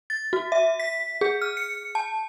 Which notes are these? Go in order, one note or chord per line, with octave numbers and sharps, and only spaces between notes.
A6
F#4
E5
B6
G#4
F6
C#7
A5